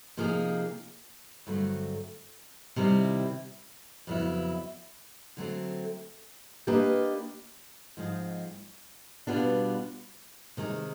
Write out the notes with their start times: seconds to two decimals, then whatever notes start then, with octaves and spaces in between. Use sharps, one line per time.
0.17 C3 F3 A#3 D#4 G#4
1.47 G2 D3 F#3 A3 C4
2.76 C3 D#3 G3 C4 E4
4.07 F2 C#3 F#3 B3 E4
5.37 D3 F#3 A3 C4
6.67 A#3 D4 G4 B4 D#5
7.97 G#2 F3 G#3 C4
9.27 B2 G3 B3 D4 F4
10.57 C3 D#3 G#3